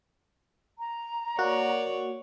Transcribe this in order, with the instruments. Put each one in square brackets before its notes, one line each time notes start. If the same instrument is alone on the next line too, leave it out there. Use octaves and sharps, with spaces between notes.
[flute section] A#5
[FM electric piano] A#3 F#4 [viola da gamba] C#5 D5